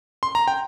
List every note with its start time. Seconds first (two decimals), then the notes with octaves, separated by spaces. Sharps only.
0.23 C6
0.35 A#5
0.48 G5